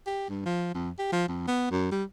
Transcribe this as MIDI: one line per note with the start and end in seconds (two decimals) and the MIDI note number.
0.07 0.27 67
0.29 0.42 43
0.46 0.70 53
0.75 0.90 41
0.99 1.09 67
1.13 1.28 53
1.28 1.45 41
1.48 1.68 59
1.71 1.89 42
1.92 2.04 55